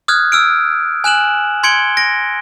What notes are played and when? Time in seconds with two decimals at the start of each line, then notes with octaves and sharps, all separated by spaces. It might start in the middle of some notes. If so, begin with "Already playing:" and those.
0.08 D#6 F6 F#6 G#6
0.32 E6 F6 D7
1.04 G#5 F#6 E7 F#7
1.63 C6 G#6 C#7 D7 G7
1.97 A#6 D7